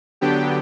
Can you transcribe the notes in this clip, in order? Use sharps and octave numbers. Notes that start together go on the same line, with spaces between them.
D3 F#3 B3 D4 G4 G5